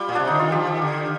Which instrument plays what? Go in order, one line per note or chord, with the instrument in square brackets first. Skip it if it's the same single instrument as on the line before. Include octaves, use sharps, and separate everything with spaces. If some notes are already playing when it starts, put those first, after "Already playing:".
Already playing: [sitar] G3 [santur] F4
[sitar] A#2
[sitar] C3 [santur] D4
[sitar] D3 [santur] D#4
[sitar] D#3 [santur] F4
[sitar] F3 [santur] G4
[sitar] D#3
D3